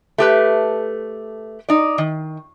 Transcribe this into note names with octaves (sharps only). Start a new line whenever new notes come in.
A3 G4 B4
D#4 D5
D#3